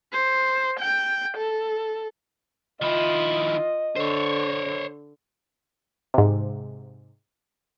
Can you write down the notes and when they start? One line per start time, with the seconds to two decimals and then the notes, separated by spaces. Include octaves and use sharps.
0.12 C5
0.80 G5
1.37 A4
2.82 D#3 E4 F4 D#5
3.96 D3 C5 C#5
6.14 G#2 C3